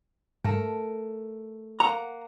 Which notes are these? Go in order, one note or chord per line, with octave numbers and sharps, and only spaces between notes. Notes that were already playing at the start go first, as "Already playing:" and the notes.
G#2 A3 A#4
A#3 F#5 A#5